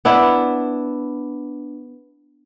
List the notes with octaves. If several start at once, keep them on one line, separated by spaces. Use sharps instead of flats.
B3 D4 E4